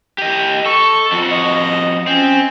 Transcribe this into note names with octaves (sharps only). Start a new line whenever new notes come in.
G4 D#5
A4 C#6
F2 F4 F#4
D#5
C4 C#4